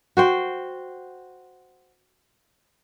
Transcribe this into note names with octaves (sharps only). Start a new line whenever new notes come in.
F#4 C5 G5